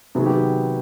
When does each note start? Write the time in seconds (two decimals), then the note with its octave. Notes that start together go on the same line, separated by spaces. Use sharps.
0.15 C3 D#3 F#3 B3 G#4
0.26 G4